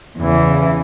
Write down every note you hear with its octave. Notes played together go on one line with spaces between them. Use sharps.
E2 C#3 E3